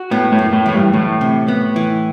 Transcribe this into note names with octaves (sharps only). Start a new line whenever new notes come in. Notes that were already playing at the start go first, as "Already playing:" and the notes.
Already playing: F#4
A2 B3
A2
F#2
A2
A2 E3
G2
D2 A2
C3
B3
E3